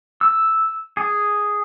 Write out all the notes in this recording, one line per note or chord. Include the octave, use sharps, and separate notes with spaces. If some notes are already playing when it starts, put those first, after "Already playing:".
E6
G#4